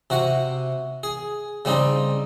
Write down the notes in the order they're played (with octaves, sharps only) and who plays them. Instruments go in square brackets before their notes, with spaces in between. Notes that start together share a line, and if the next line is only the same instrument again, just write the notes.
[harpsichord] C3 F#4 F#5
G#4
C#3 G3 C4 D#4